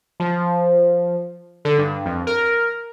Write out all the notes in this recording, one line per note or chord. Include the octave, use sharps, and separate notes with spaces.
F3
D3
G2
F2
A#4